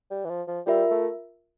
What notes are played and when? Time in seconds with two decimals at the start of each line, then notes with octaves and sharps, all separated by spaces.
0.11 G3
0.25 E3
0.30 F3
0.48 F3
0.66 G3 F4 A#4 E5
0.91 A3